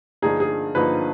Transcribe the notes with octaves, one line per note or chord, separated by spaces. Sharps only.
G2 D3 F3 A#3 D#4 G#4
G#4
G2 D3 F3 A#3 D#4 B4